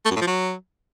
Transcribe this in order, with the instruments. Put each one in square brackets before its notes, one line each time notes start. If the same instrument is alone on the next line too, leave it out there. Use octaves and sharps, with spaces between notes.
[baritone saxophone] A3
F#2
A2
F3
F#3